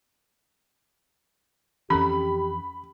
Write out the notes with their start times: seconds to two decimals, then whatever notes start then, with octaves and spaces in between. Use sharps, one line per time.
1.90 F2 E3 C#4 G4 A4 B5